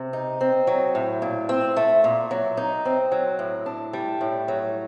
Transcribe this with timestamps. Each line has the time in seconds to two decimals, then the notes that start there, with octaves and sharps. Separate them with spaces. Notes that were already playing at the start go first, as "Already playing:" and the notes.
Already playing: C3
0.13 D#4
0.41 C4
0.67 F#3
0.95 A2
1.22 A#2
1.49 C4
1.76 A3
2.04 A#2
2.31 F#3
2.57 D#4
2.85 C4
3.12 F#3
3.39 A2
3.66 D4
3.93 G3
4.21 A2
4.48 F#3